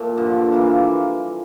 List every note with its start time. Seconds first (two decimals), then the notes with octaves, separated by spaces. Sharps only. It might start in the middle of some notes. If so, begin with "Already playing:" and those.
Already playing: A#2 A3
0.17 G2 D3 F3
0.52 E3 A#3 E4